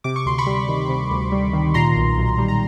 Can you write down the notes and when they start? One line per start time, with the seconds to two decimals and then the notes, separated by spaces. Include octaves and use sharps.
0.04 C3 D6
0.16 C#6
0.26 D2 C6
0.38 B5 C#6
0.47 G3
0.69 D#3
0.89 C3
1.11 D2
1.32 G3
1.53 D#3
1.74 A#2 A#5 C6
1.96 B1
2.17 B1
2.38 G3
2.48 A#5